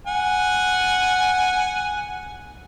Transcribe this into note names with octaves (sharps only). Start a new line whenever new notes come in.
F#5 G#5